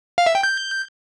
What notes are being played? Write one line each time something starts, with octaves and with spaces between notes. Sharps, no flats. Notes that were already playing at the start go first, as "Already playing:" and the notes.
F5
E5
G5
G6